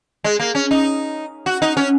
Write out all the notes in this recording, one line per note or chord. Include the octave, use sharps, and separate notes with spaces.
G#3
A#3
C#4
D#4
F#4
D#4
C#4